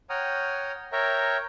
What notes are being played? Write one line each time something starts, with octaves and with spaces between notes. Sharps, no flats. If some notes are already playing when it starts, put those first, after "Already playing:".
C#5 F#5 G5 A#5 D#6 F6
A#4 C#5 E5 G5 A#5